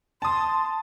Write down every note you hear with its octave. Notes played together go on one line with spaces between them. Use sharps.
A5 C6 D#6